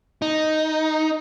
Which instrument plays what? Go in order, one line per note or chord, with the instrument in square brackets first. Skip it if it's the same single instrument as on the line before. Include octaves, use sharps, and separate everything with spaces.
[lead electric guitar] D#4